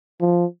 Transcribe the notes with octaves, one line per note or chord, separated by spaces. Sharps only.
F3